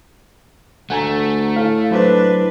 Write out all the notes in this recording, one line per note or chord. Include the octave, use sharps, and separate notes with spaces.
D2 A3 F#5 G#5 A#5
A2 F5
F#3 D4 E4 B4 C5